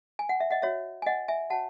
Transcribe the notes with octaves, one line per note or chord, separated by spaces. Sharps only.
G#5
F#5
E5
D#5 F#5
F#4 C#5 E5
G#5
D#5 F#5
E5 G#5
F#4 C#5 F#5 A5